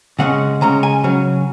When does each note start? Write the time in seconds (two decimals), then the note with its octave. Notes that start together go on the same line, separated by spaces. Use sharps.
0.19 C#3 G#3 C#4 F#5
0.61 C#3 G#3 C#4 A#5
0.83 G#5
1.04 C#3 F#3 C#4